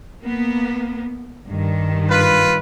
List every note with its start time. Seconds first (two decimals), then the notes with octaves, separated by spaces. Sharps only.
0.23 A#3 B3
1.48 G2 D#3
2.09 F4 B4